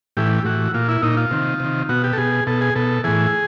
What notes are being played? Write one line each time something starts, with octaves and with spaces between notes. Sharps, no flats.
A2 E3 G4
A2 E3 F#4
A#2 F4
E4
A#2 D#4
F4
C3 D#3
C3 D#3
B2 F#4
G4
A4
B2 G#4
B2 A4
G#4
B2 A4
A2 E3 G#4